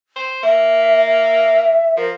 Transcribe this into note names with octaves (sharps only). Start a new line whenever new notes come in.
C5
A#3 E5
E5
F3 A#4